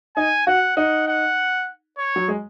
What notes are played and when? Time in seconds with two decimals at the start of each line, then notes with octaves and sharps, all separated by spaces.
0.17 D#4 G#5
0.47 F#4 F#5
0.76 D#4 F#5
1.08 F#5
1.98 C#5
2.16 F#3
2.28 G#3